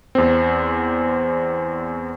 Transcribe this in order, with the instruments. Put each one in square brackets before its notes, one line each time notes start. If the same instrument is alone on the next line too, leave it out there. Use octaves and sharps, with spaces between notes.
[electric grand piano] E2 C4